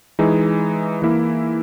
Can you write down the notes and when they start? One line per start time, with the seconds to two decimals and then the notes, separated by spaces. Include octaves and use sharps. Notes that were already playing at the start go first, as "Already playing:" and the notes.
0.19 E3 G#3 D#4 G#4
1.02 E3 A#3 E4